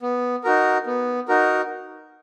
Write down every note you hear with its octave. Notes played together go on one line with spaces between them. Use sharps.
B3
D#4 F#4 A#4
B3
D#4 F#4 A#4